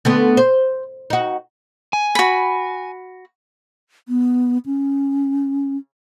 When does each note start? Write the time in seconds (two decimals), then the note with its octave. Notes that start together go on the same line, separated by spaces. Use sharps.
0.05 D3 A3 B3
0.37 C5
1.10 D#4 F#4
1.93 G#5
2.15 F#4 B5
4.09 B3
4.66 C#4